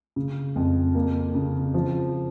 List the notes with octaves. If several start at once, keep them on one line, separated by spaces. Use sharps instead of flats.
C#3
F2
A#3
C#3
F3